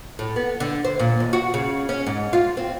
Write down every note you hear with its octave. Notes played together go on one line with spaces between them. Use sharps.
A2
B3
D3
C5
A#2
D#2
F#4
C#3
C#4
G#2
F4
C4